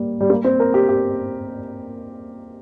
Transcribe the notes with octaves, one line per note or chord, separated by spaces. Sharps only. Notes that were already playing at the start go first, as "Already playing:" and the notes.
Already playing: G3 A#3
G3
A#3
C4
A#4
G4
G4